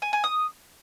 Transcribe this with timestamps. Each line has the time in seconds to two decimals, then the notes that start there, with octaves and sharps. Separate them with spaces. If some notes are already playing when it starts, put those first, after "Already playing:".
0.02 G#5
0.13 G#5
0.24 D#6